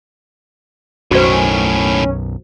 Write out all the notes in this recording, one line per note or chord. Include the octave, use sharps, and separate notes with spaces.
B1 F#2 A2 D#3 C#4 F#4 C5